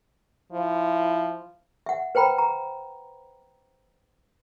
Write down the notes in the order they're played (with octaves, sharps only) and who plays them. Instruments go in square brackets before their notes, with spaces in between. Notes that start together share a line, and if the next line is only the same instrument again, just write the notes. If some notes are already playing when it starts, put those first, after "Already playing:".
[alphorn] F3 [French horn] E4
[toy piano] E5 F#5
B4 C5 G5 A#5 B5
A#5